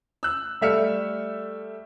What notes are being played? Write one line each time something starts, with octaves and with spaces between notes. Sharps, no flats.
E6 F#6
G3 A3 E5 F6 C#7